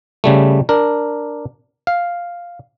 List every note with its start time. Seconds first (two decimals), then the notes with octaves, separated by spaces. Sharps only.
0.24 C#3 G3 A3
0.69 D4 A#4
1.87 F5